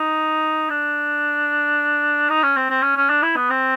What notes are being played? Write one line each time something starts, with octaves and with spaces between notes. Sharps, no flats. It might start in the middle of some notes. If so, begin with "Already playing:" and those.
Already playing: D#4
D4
D#4
C#4
C4
C4
C#4
C#4
D4
E4
B3
C4